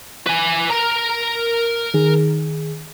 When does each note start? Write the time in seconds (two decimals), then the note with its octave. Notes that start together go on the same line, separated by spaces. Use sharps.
0.27 B4 G#5
0.70 A#4 A#5
1.94 D#3 G#4